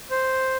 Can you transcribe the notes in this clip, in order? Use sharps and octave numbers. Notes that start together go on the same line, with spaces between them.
C5